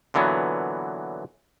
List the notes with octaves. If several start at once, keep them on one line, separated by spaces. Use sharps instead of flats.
A#2 D3 E3 F#3 B3